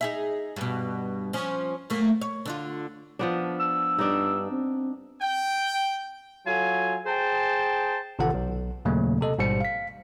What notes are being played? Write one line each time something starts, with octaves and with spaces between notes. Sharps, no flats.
D#4 G#4 E5
G2 B2
F3 C#4
F#2 A3 A#3
C#5
D3 D4 F4
F3 B3 D4
E6
G2 D4 D#4
C4
G5
F#3 F4 A4 G#5
G#4 C5 G5 A5
A1 C3 D#3 F4 A4 F#5
B1
D#2 A#2 C#3 F#3 A3 A#3
C3 A4 D#5
A1 G#2 B2 G3 C5 C#7
F5 B6